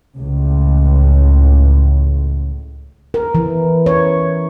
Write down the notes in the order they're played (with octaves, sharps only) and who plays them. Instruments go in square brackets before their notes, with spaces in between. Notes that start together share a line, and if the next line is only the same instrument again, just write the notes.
[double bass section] C#2 A2
[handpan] A#4
E3
C#5